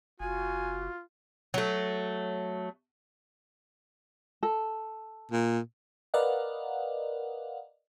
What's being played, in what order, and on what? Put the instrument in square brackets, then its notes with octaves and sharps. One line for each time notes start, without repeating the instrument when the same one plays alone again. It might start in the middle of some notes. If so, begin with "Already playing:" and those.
[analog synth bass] F#1 [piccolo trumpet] F4 [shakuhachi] F#4 [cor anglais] G#5
[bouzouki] F#3 A3
[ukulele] A4
[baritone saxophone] A#2
[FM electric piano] A#4 B4 D5 D#5 F5 F#5